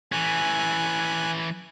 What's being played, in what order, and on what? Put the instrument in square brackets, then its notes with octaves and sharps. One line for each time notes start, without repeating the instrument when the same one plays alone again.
[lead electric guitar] E3 C#4 [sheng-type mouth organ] G#5 F#6